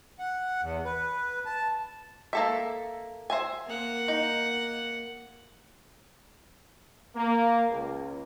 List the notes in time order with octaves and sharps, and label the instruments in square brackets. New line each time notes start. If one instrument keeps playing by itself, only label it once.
[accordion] F#5
E2
B4
A5
[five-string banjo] A#3 A4 E5
C5 E5 G#5
[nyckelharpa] A#3 F#5
[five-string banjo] D#4
[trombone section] A#3
C#2